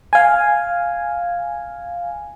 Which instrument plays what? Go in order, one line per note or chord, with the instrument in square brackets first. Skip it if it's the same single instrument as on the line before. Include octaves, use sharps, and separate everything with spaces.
[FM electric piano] F5 G#5